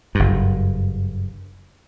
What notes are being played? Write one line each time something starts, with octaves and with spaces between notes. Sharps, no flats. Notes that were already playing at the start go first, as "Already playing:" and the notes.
F#1 G2